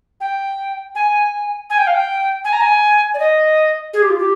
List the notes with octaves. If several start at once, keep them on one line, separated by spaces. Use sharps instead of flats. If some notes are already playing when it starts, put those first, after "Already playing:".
G5
G#5
G#5
G5
F5
G5
G#5
A#5
G#5
D5
D#5
G#4
G4
F4
G4